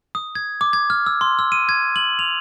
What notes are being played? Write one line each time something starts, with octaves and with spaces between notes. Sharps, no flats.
D#6
G#6
D6
G#6
F6
E6
C6
E6
D#7
G#6
F#7
F7